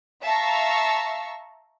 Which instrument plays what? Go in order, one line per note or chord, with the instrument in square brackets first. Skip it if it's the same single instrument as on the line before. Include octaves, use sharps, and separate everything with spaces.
[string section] E5 F5 A5 A#5 C#6 E6